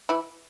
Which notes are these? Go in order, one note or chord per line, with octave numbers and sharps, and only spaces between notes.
E3 E4